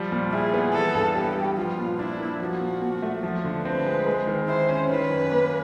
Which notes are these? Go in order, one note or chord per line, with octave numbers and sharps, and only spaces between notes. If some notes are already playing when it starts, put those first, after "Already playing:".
Already playing: F3 G3
A#2
E4 G#4
B3
E3 A4
G2
B3 G4
G3
F3 F4
A#2
D4 E4
A#3
F3 F#4
A#2
A#2
A3
F3
D3
C4 B4
G#3
G#3
D#3
E4 C5
C#4
D#3 B4
F#2
A#3